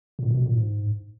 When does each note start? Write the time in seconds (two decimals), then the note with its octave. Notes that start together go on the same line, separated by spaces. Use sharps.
0.19 A#2
0.30 B2
0.42 A#2
0.54 G#2